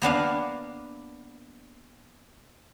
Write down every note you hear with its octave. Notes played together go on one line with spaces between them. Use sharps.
A#3 B3 D4 F5